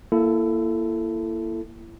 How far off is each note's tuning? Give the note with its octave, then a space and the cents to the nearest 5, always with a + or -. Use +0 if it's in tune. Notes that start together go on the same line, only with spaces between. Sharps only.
A#3 +0 E4 +25 A4 +0